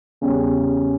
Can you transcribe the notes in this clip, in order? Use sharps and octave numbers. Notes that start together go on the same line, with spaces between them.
E2 C#3 G3 C#4 G4